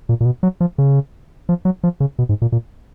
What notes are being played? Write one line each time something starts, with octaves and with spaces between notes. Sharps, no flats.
A#2
A#2
B2
F#3
F3
C#3
F3
F#3
F3
C#3
B2
G#2
A#2
A#2